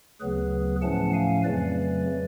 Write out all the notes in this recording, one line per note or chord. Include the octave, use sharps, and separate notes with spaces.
D2 C#3 F#3 B3 G#4 B4
A2 F3 A3 C#4 F#5 A5
F5 G#5
F2 C#3 F#3 A3 B4 D5